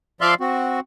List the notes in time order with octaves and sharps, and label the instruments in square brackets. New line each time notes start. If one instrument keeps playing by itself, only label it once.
[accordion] F3 D5 E5 F5 C6
C4 F#4